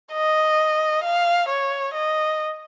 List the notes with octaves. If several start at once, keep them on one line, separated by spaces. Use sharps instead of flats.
D#5
F5
C#5
D#5